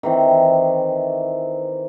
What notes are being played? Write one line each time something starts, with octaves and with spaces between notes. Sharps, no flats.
D#3 E3 C4